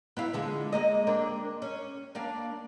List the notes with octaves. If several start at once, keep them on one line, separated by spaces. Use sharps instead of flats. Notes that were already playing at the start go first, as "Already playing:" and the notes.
B3 E4 F5
D3 F3 G#3
G#3 A#3 D#5
A#3 C4 D4
C#4
A#3 D4 F5